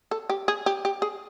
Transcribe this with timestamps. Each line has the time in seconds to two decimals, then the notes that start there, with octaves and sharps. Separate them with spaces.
0.11 A4
0.29 G4
0.48 G#4
0.66 G4
0.85 G4
1.02 G#4